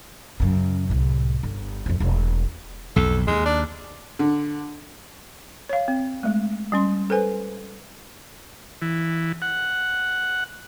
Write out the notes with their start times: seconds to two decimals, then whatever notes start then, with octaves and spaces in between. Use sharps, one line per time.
0.40 F#2 C#3
0.89 C2 A2
1.43 G1
1.86 F2 F3
2.00 E1 A3
2.96 B1 F2 A4
3.27 D#2 G#3
3.46 D4
4.19 D3
5.69 C#5 F5
5.88 C4
6.23 G#3 A3
6.72 G3 C#4 C6
7.10 A4 B4 C5 G#5
8.82 E3
9.42 F#5